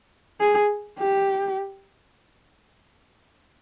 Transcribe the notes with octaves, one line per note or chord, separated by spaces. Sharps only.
G#4
G4